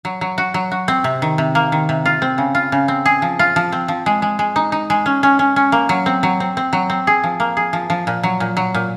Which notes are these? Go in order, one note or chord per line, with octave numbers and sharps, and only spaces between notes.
F#3
F#3
F#4
F#3
F#4
C4
C3
D#3
C3
A#3
D#3
C3
F4
C4
C#3
F4
C#3
C4
G#4
F3
F4
F3
C4
F3
G#3
G#3
G#3
D#4
D#4
G#3
C#4
C#4
C#4
C#4
A#3
F#3
C4
F#3
C4
C4
F#3
C4
G#4
F3
A#3
G#4
F3
F3
A#2
F#3
A#2
F#3
A#2